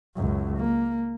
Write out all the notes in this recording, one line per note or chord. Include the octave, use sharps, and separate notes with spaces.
C#2 F#2
A#3